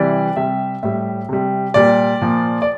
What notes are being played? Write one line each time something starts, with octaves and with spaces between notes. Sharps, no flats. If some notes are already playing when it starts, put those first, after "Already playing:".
Already playing: C3 E3 G3 D5
C3 G3 E5
A2 G3 E5
C3 G3
A#2 G3 D5
A#2 F3
D5